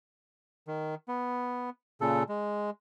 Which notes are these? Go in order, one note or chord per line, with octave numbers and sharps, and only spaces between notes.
D#3
B3
A#2 C#3 A4
G#3